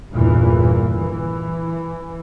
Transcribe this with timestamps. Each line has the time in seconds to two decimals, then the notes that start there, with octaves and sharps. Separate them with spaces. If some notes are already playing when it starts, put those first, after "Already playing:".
0.11 G1 E2 A#2 E3
1.01 E3